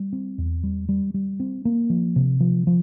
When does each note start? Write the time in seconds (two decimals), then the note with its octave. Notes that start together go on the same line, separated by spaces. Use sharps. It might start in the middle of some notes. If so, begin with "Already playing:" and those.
Already playing: G3
0.13 C4
0.38 E2
0.63 G3
0.89 G3
1.14 G3
1.40 C4
1.65 A#3
1.90 F3
2.16 C3
2.40 F3
2.67 F3